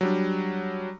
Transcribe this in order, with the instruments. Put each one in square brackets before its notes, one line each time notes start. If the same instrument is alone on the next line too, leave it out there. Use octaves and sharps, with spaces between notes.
[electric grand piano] F#3 G3 D4